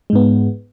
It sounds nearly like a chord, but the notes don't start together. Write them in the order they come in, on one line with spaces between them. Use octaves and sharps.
G#3 G#2 B3